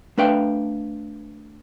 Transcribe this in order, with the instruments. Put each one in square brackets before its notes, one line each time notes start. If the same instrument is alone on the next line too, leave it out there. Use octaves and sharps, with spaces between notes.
[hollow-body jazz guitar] A3 D4 B4 F5 G5